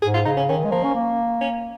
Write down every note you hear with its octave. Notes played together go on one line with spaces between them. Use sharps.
G#2 G#4
F4
C#3 D#4
C#4
D#3 C#4
G#3
F3 A#3
C#4
A#3
C#4